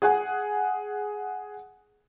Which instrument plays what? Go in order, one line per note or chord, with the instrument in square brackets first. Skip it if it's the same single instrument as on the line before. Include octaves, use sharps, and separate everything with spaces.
[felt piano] G#4 F#5 G#5